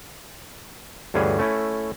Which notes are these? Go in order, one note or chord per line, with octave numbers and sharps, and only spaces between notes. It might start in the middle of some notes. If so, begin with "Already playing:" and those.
D2 G2 E3 C#4 G#4
A3 C#4 E4